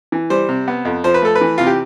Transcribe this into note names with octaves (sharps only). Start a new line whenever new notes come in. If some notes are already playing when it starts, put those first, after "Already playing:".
E3
G3 C5
C3
B3
F2
F3 C5
B4
A3 A4
B4
E3
C3 F4
G4